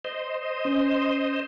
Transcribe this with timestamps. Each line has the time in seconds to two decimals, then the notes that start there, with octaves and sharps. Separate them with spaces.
0.05 C5 D#5
0.65 C#4